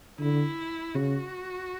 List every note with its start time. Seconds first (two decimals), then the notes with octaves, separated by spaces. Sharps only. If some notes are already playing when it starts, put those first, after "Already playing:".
0.20 D3 E4
0.95 C#3 F#4